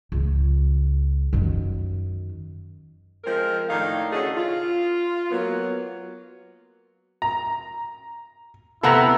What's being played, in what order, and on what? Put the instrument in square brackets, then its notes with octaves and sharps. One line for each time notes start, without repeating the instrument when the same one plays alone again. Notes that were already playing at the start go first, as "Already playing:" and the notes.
[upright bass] C#2
F#2 D#3
[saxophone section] F3 G#3 C4 A#4
A2 D#3 D4 D#5 F5
C#3 A3 C#4 F#4 G#4 D#5
F4
F#3 A#3 B3
[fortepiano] A#5
[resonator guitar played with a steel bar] C3 B3 C4 [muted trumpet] E4 [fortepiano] A4 F#5 A#5